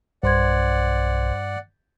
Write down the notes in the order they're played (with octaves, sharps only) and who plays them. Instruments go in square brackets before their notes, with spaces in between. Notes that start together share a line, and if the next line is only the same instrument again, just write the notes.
[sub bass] B1 [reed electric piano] G2 [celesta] C5 C6 G#6 [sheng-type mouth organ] D5 F#5